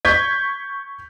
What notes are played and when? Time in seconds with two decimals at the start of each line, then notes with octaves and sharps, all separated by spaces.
0.05 C#6 G6 G#6 B6